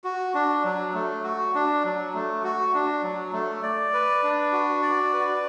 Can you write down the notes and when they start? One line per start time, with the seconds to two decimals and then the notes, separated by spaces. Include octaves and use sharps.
0.04 F#4
0.34 D4
0.64 F#3
0.94 A3
1.24 F#4
1.55 D4
1.85 F#3
2.14 A3
2.44 F#4
2.74 D4
3.03 F#3
3.33 A3
3.62 D5
3.94 B4
4.23 D4
4.53 F#4
4.82 D5
5.13 B4